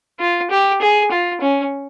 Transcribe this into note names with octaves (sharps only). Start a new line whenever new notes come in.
F4
G4
G#4
F4
C#4